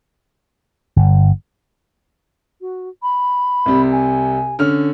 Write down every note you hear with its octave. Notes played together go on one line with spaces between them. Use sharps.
G1
F#4
B5
C2 C3
G#5
D3 C#4 F6